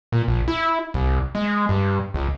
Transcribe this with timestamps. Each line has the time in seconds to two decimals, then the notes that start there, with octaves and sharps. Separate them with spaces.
0.12 A#2
0.28 A#1
0.48 E4
0.94 C2
1.35 G#3
1.69 G2
2.14 C#2